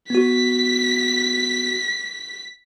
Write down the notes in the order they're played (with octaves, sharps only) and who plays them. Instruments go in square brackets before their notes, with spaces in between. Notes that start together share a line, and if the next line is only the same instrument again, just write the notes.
[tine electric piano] B3 F#4 [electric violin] B6